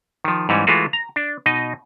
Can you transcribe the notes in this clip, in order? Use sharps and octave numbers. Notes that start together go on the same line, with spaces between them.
D#3 F3
G#2 E3 G3 C#4
E3 G#3 A3 F4 F#4
A#5
D4
B2 D#4 D#5